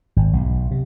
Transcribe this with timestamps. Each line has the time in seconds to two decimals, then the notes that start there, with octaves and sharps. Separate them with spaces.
0.16 G#1
0.33 B1
0.71 C3